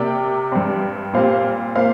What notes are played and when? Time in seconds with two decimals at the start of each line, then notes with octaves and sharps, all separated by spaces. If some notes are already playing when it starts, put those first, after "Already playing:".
Already playing: C3 A#3 D5 G5
0.52 G2 G3 C4
1.14 A#2 G3 C4 C5 F5
1.75 A#2 A#3 C5 F5